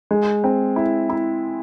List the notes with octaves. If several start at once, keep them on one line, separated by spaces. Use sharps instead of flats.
G#3
C4
E4
E4